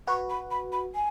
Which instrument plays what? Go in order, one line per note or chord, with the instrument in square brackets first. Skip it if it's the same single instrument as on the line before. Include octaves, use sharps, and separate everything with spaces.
[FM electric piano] F#4 B4 [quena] C#6
[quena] B5
B5
B5
G#5